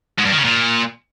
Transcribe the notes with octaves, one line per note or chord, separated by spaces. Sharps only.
G#2
G2
D#3
C#3
A#2